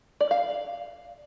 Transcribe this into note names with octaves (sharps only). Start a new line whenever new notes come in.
D5
F5